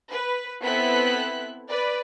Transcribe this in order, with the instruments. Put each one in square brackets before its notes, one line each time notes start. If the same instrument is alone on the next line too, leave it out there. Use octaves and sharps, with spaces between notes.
[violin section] B4
B3 C4 E4 A4 F#6 B6
B4 D5